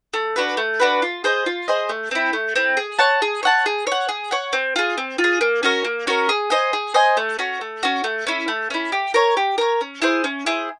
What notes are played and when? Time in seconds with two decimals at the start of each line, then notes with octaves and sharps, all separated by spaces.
0.14 A3
0.36 D4 F#4 B4
0.57 A3
0.80 D4 F#4 B4
1.02 F4
1.24 G#4 C5 D#5
1.46 F4
1.68 G#4 C5 D#5
1.89 A3
2.11 C4 E4
2.33 A3
2.56 C4 E4
2.77 G#4
2.99 C#5 F#5 A5
3.22 G#4
3.43 C#5 F#5 A5
3.66 G#4
3.87 C#5 F#5
4.09 G#4
4.31 C#5 F#5
4.53 C4
4.76 F4 G#4
4.98 C4
5.18 F4
5.24 G#4
5.41 A#3
5.63 C#4 F#4 A#4
5.84 A#3
6.07 C#4 F#4 A#4
6.29 G#4
6.50 C5 D#5 G#5
6.73 G#4
6.94 C5 D#5 G#5
7.17 A3
7.39 C#4 F#4
7.61 A3
7.83 C#4 F#4
8.04 A3
8.27 C#4 E4
8.48 A3
8.70 C#4 E4
8.92 G4
9.14 A#4 C#5
9.37 G4
9.58 A#4 C#5
9.81 C#4
10.02 E4 G#4 C5
10.24 C#4
10.46 E4 G#4 C5